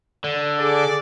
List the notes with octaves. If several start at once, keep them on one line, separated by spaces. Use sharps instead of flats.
D3
G#4 A4 D5